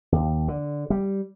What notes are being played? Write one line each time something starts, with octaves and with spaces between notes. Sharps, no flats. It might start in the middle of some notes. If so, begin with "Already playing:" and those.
D#2
D3
G3